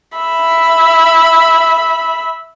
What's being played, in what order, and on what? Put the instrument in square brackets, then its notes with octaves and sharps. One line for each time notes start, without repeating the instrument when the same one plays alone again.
[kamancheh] E5 B5